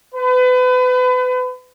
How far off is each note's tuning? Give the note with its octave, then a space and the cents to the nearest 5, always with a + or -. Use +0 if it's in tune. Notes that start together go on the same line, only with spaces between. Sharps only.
B4 +35